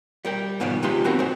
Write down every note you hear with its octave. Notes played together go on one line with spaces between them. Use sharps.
G3 A#4 G5
G#2 B2 D#3 F3 G3
C3 G#3 D#4 F4 B4 C6
B3 C4 F#4 A#4
G#3 C5